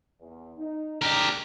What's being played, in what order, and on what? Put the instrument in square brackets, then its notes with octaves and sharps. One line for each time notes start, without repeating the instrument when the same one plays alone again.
[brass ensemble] E2
D#4
[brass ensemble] G#3 D4 [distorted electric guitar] G4 A#4